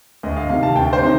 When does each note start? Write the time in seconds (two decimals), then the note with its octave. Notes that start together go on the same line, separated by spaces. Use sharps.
0.23 D2 D#5
0.37 F5
0.49 C3 D#3 F5
0.63 A5
0.75 D2 G5
0.93 C5
1.02 C3 D#3